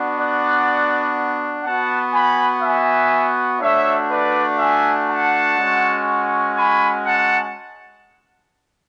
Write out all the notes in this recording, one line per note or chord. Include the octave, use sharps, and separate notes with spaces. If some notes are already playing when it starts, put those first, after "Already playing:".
Already playing: B3 D4 F#4
D5 F#5
B3 F#4 F#5 A5
G#5 B5
E5 G#5
A3 D4 F#4 C#5 E5
B4 D5
E5 G#5
F#5 A5
G#3 C#4 F#4
G#5 B5
F#5 A5